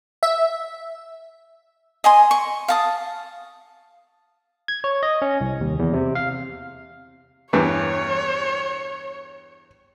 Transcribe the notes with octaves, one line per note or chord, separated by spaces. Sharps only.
E5
D#5 G#5 C6
C#6
F5 A5 D#6
G#6
C#5
D#5
C#4
C2
D#2
E2
C3
F5
E2 G2 E3 C#5